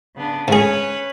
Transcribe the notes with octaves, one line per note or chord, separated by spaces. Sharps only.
C#3 B3 D4
G#2 C#4 G#4 B4 C#5